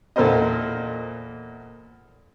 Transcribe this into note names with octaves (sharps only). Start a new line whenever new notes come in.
E2 A#2 A4 A#4 C5 D#5